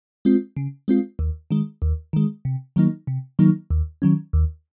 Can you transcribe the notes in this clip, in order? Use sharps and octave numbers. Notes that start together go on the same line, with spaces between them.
G#3 C4 F4
C#3
G#3 C4 F4
D#2
D#3 G#3
D#2
D#3 G#3
C3
D#3 F#3 A#3 D#4
C3
D#3 F#3 A#3 D#4
D#2
D#3 F#3 C#4
D#2